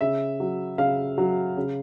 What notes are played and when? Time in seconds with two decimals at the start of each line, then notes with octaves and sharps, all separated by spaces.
0.01 C#3 E5
0.40 F#3
0.78 C#3 F5
1.18 F#3
1.57 C#3